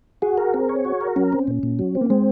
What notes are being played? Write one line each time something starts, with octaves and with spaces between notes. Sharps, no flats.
F#4 G#4
A#4
C4
C#5
F#4
A#4
F#3 C#4
C4
A#2
A#2
F#3
C4
A#3
G#3 C4